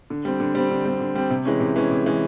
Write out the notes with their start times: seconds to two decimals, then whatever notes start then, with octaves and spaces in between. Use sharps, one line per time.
0.10 D3
0.25 G3 C4
0.40 D3
0.55 G3 C4
0.71 D3
0.85 G3 C4
1.00 D3
1.15 G3 C4
1.30 C3
1.45 E3 G#3 C#4
1.60 C3
1.76 E3 G#3 C#4
1.91 C3
2.06 E3 G#3 C#4